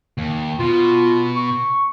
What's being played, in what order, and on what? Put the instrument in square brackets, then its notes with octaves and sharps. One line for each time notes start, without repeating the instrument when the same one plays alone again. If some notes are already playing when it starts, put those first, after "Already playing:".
[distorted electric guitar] D#2
[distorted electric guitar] B2 [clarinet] F4
[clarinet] C#6